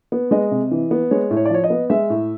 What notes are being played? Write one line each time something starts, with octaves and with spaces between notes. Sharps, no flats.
B3
G#3 D#5
C3
E3
B3
G#3 C#5
A2
C#5
D5
F3 C#5
D#5
B3
G#3 E5
A2